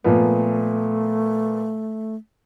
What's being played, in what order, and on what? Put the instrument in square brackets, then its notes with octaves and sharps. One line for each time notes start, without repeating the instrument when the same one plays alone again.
[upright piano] A#2 F3 B3 [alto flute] A3